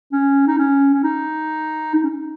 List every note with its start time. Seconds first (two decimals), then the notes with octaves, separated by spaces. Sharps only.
0.13 C#4
0.47 D#4
0.59 C#4
0.94 C#4
1.04 D#4
1.95 D#4
2.03 C#4
2.10 D#4